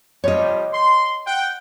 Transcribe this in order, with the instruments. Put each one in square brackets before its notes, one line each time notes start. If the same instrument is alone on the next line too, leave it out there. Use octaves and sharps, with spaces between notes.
[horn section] C3 F3 G3 [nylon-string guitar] C#5 D#5
[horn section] C6
F#5 G5